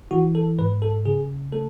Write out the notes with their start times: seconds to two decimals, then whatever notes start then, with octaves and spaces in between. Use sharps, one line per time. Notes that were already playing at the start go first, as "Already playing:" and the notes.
0.11 E3 F#4
0.35 A4
0.58 G#2 B4
0.82 A4
1.06 C#3 G#4
1.52 A3 A4